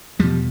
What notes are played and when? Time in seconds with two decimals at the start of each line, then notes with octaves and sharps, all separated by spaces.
0.19 E2 B2 F3 G3